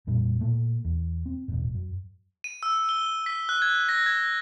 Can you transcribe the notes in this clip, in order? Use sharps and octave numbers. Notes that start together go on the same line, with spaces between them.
F2 A#2 G3
A#2 A3
E2
C4
E1 A1 G#2
F#2
D#7
E6
G7
B6
F#6
G#6
A#6
G#6